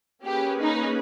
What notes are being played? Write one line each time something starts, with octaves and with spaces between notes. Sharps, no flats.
A#3 C#4 G4 G#4 B4
D#4